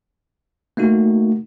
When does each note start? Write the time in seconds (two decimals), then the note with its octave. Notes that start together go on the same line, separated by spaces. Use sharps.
0.77 A3 A#3 D#4 F#4